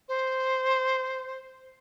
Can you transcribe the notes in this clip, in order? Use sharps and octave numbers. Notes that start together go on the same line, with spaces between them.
C5